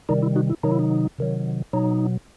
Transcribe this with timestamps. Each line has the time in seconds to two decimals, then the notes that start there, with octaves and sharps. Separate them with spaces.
0.09 C3 D#3 G3 D#4
0.23 E4
0.36 D#4 F#4
0.50 E4
0.63 C3 D#3 F#3 D#4
0.72 E4
0.79 D#4
1.18 C3 D#3 F#3
1.73 B2 F#3 D#4